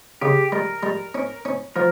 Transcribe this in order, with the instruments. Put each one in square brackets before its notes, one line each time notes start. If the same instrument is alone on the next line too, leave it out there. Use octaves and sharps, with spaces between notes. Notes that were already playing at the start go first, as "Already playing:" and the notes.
[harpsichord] C#3 [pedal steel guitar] G4
[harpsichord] G3 [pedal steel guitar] A#4
[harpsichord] G3
C#4
C#4
[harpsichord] F3 [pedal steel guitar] A#4